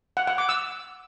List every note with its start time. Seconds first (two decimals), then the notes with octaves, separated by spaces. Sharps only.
0.17 F#5
0.27 F#5
0.38 D6
0.49 E6